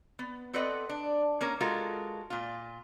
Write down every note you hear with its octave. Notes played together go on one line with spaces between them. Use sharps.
B3
C4 A4 B4 D5 D#5 F#5
D4
A#3 C#4 A#4
G#3 F4 F#4 A4 A#4
A#2 F4